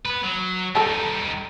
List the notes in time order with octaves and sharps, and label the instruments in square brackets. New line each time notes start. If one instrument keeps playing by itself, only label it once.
[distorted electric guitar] B3 B4
F#3
[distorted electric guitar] G3 D#4 [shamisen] A4 A5